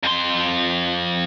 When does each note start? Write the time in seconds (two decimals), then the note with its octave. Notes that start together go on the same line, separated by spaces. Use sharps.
0.03 F2 C6